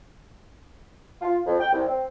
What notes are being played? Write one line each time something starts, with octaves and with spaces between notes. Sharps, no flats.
F4
F2
G5
C2
C4